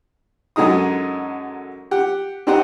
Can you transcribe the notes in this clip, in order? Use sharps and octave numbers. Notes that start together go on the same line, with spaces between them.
F#2 D3 G#3 D#4 D#6
G4 F#5
C4 D4 D#4 G4 C5 F#5